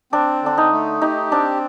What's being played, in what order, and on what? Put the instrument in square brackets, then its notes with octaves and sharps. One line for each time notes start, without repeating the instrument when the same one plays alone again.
[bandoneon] C4 [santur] D4
[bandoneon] D3 [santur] D4
[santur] D#4
[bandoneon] A3
[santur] D#4 [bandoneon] G4
[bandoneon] C4 [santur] D4